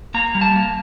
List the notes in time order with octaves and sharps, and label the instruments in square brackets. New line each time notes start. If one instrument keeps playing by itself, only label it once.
[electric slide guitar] A#3 A#5
G3
A5
A#3